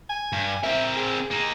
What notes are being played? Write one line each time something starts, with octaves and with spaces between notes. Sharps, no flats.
G#5
G2
C4 A#4 E5
G#4
A#3 D#4